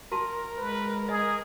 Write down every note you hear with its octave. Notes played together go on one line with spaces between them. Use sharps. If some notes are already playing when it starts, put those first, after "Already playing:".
F#4 A#4 A5 C6
G#3 B4
G#4 D#5